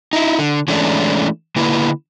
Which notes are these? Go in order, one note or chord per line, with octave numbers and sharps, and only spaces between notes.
D#4 E4
D3
E3 G#3 A3 C#4 D4 E4
D3 A#3 E4 B4